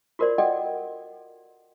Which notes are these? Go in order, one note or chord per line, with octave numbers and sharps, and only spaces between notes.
F4 F#4 A#4 C5 D5
F#4 A4 D5 D#5 F#5 G5